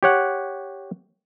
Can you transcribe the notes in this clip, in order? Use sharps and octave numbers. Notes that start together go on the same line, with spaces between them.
G4 C#5 F#5